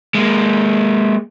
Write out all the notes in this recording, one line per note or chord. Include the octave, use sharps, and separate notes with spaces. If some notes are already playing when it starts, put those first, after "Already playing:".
G#3 A#3